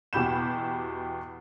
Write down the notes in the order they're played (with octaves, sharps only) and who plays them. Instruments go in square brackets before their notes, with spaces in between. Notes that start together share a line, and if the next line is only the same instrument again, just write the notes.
[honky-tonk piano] E2 B2 G4 B5 G6 E7